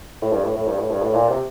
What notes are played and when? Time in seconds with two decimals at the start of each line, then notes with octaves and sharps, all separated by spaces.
0.22 A2
0.33 G2
0.44 A2
0.56 A2
0.68 G2
0.79 A2
0.91 G2
1.02 A2
1.14 A#2
1.29 C3